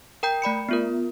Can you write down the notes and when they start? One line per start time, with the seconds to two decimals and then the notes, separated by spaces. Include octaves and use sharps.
0.23 A#4 G5 A#5 G6
0.42 A3 D5 B5 C#7
0.69 B3 F4 A#4